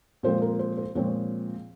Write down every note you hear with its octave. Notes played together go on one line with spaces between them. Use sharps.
A#2 F3 G#3 C4 C5
A#4
C5
C5
A#2 F3 G#3 C4 C#5